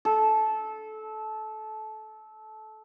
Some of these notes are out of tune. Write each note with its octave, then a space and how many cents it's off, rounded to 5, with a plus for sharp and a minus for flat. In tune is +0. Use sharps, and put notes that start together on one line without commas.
A4 -20